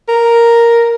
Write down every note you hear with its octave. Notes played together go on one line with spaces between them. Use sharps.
A#4